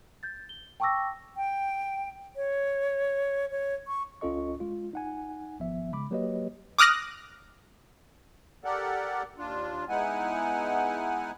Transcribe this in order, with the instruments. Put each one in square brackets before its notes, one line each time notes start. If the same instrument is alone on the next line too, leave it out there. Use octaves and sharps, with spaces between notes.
[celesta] G6 A6
G7
G5 A5 C#6 D6 E6 A#6
[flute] G5
C#5
C#5
C#6
[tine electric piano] C#2 C#4 F4 A4 D#5 C#6
G#3 F4
D#4 F#5 G#5
G#1 F3 B3 E5
C#3 G#3 B5 D6
F#3 A#3 G4 B4 C#5 D#5
[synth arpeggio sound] D6 D#6 F6 F#6 A#6
[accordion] G4 A4 A#4 D5 F#5
D#2 D4 F4
G#3 B3 D#4 E4 F#5 G#5